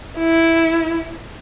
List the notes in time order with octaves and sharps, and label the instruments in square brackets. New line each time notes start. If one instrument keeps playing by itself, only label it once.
[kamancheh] E4